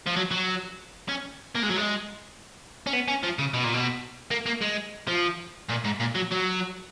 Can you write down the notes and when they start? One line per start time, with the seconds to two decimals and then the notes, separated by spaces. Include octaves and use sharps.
0.07 F3
0.17 F#3
0.31 F#3
1.09 C#4
1.55 A#3
1.62 G#3
1.69 F#3
1.77 G#3
2.87 C#4
2.93 B3
3.08 C#4
3.23 F3
3.39 C#3
3.54 B2
3.64 A#2
3.74 B2
4.31 A#3
4.46 A#3
4.61 G#3
5.07 F3
5.69 A#2
5.84 G#2
6.00 A#2
6.15 F#3
6.31 F#3